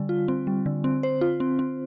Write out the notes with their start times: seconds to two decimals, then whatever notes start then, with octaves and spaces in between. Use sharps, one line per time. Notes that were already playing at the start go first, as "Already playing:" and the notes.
Already playing: D3 G3
0.09 F4
0.28 C4
0.47 G3
0.66 D3
0.84 C4
1.03 C5
1.21 F4
1.40 C4
1.59 C4